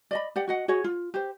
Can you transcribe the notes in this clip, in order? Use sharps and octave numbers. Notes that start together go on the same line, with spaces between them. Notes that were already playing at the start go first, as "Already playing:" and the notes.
D5 D#5 B5
G4 D5 F#5
F#4 D#5 F#5
F#4 G#4 C#5 F#5
F4
G4 C5